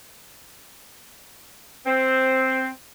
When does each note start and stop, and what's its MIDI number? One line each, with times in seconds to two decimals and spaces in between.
1.85 2.67 60